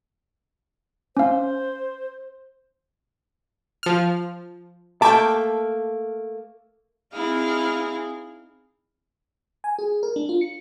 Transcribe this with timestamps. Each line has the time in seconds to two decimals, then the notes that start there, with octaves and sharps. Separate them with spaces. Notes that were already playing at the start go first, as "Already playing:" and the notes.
1.17 C#4 C5 F5
3.83 F3 F6
5.02 A3 A#3 G5 A5 D6
7.13 C4 D#4 E4 G#4 F5
9.64 G#5
9.79 G#4
10.03 A#4
10.16 D4
10.29 F4
10.41 C#7